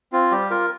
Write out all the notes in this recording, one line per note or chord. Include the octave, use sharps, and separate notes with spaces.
C4 F4
G3 G4
F4 A#4